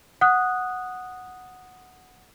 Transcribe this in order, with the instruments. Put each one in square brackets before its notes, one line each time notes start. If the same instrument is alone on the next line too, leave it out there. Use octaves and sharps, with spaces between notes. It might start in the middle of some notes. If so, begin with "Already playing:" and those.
[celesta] F#5 D#6 F#6